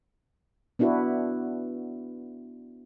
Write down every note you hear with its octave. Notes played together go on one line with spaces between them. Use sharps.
B3 D4 E4 F#4 B4